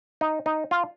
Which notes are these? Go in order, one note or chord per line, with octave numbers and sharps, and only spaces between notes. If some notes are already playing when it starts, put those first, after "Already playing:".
D#4
D#4
F4